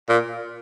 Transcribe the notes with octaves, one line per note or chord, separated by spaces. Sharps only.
A#2